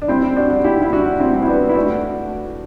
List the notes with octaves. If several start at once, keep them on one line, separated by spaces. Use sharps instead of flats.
D4
G3 C4 E4
D4 F#4
G3
E4 G4
E4
G3 D4 F#4
C4 E4
G3
E4
B3 D4
E4
A3 D4 F#4